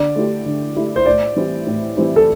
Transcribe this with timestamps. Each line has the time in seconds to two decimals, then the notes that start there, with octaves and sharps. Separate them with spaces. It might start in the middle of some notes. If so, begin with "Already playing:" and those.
Already playing: D3 D5
0.16 A3 E4 G4
0.46 D3
0.75 A3 E4 G4
0.96 C5
1.06 A2 D5
1.36 E3 G3 C4 E4
1.67 A2
1.96 E3 G3 C4 E4
2.16 A4